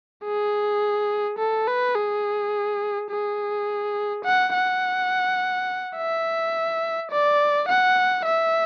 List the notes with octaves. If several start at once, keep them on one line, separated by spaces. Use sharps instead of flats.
G#4
A4
B4
G#4
G#4
F#5
F#5
E5
D5
F#5
E5